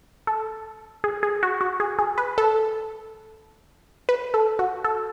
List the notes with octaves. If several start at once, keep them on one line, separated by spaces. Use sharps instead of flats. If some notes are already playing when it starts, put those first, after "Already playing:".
A4
G#4
G#4
F#4
F#4
G#4
G#4
B4
A4
B4
A4
F#4
A4